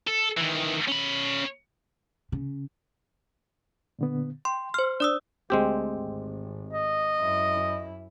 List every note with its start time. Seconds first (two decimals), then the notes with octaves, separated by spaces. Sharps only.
0.07 A4
0.37 D#3 E3
0.88 C#4 B5
2.32 C#3
3.99 A#2 D3 B3
4.45 G5 C6
4.74 C5 C6 F6
5.00 D4 D5 D#6 E6
5.50 D2 G#3 C4 G4
5.92 G#1
6.73 D#5
7.20 F#2 E4